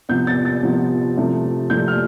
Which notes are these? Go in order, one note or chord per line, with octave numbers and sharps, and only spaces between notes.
C3 F3 B3 G6
A6
A6
C3 F3 B3
C3 F3 A3 C4
C3 F3 A3 C4 G6
F6